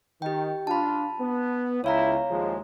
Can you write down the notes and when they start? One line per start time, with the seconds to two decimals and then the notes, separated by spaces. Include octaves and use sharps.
0.22 D#3 G4 G5
0.67 D4 F4 A5 B5
1.21 B3
1.84 C#2 E4 C#5 F5 A#5
2.31 D#2 F3 G#3